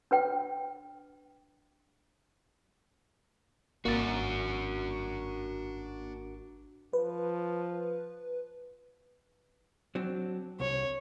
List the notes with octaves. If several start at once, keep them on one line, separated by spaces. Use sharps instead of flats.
D4 B4 G5
G#1 A#3 D4 F#4 A#4 D5 A6
F3 B4
F#3 C4 D4
C2 C#5